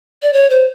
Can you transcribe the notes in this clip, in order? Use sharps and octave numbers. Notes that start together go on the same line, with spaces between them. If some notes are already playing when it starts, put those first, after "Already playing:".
D5
C#5
C5